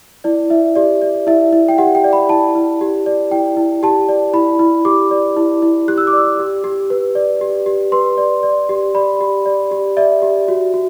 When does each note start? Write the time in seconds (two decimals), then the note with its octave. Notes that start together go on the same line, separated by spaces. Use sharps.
0.24 E4 D5
0.50 E4 E5
0.75 G4 D5
1.02 D5
1.27 E4 E5
1.53 E4
1.68 G5
1.78 G4 F#5
1.95 G5
2.04 D5
2.13 B5
2.29 E4 A5
2.55 E4
2.81 G4
3.06 D5
3.31 E4 G5
3.57 E4
3.83 G4 A5
4.09 D5
4.33 E4 B5
4.59 E4
4.85 G4 D6
5.11 D5
5.36 E4
5.62 E4
5.88 G4 F#6
5.98 E6
6.07 D6
6.13 D5 E6
6.39 G4
6.64 G4
6.90 B4
7.15 D5
7.41 G4
7.66 G4
7.92 B4 C6
8.18 D5
8.43 D5
8.69 G4
8.95 D5 B5
9.21 G4
9.46 D5
9.71 G4
9.97 D5 E5
10.22 G4
10.48 F#4
10.74 F#4